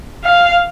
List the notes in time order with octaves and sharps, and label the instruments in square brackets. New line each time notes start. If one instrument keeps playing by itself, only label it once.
[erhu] F5